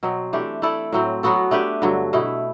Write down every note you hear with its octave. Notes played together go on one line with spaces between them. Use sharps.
B2 F#3 C4
E3 A3 D4 G4
A3 E4 A4 D5
A2 F#3 C4
F#3 B3 F#4 A4
A3 D4 G4 B4
G2 D3 F#3
B2 A3 E4